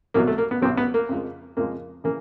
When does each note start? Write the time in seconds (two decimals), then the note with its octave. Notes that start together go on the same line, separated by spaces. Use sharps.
0.14 C2 B2 F#3 A#3
0.27 A3
0.38 A#3
0.51 B3
0.62 C2 B2 F#3 C4
0.77 B3
0.94 A#3
1.09 F2 C#3 F3 G#3
1.57 F2 C#3 F3 G#3 A#3
2.04 C#3 E3 A#3